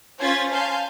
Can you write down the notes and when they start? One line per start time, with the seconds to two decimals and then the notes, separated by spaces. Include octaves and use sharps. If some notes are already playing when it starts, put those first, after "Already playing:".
0.17 C#4 F4 C5 G#6 A6 B6
0.50 F5 G#5 A5 C6 G6